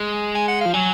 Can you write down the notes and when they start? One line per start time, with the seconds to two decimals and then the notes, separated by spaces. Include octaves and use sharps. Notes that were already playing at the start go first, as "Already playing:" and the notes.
Already playing: G#3
0.35 G#5
0.48 F#5
0.61 F3 F5
0.74 F#3 G#5